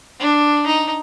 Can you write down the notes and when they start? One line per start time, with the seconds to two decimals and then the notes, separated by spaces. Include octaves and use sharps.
0.20 D4
0.66 D#4